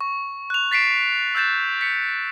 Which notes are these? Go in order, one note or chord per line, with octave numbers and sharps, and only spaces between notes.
C#6
F#6 F7
A6 B6 C7 D7 E7
E6 F#6 G6 A6 E7
B6 C#7